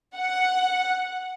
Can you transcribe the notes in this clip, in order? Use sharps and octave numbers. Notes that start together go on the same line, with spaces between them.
F#5